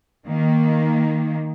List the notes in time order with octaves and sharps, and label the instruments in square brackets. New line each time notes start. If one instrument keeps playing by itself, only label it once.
[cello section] D#3 A#3